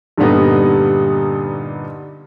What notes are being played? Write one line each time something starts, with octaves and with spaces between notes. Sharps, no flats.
G2 A#2 D3 G3 B3 D#4